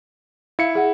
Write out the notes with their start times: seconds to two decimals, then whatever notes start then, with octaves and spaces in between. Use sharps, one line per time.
0.59 E4 F5 C#7
0.75 G#4 F#5